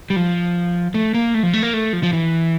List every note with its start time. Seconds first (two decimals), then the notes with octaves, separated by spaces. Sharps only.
0.10 G3
0.16 F3
0.94 A3
1.14 A#3
1.34 A3
1.43 F3
1.53 A3
1.63 A#3
1.73 A3
1.93 F3
2.03 F3
2.13 E3